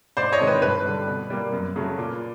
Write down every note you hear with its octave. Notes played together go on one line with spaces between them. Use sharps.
G#2 C5 D5
C#5 D#5
D#3 G#3 C4
B4
G2 B4
D3 G3
B2
G3 A#3
F#2
C#3 F#3 A3
A#2